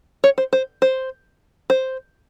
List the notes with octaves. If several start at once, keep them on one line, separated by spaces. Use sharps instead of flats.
C#5
C5
C5
C5
C5